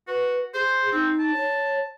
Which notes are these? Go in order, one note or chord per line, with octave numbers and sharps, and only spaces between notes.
F#4 B4
G#4 C5
C4 D#4
A5
C#5